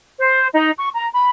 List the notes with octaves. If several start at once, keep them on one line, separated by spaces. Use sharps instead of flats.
C5
D#4
C#6
A#5
B5